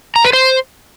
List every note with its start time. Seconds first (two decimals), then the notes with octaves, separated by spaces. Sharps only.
0.16 A#5
0.25 B4
0.33 C5